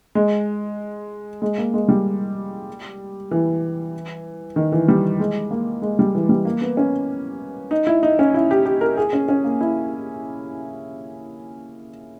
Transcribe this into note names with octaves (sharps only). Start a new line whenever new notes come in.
G#3
G#3
A#3
G#3
G3
E3
D#3
E3
G3
G#3
A#3
G#3
G3
E3
G3
A#3
B3
C#4
D#4
E4
D#4
C#4
E4
G4
G4
A#4
G#4
C#4
C#4
A#3
E4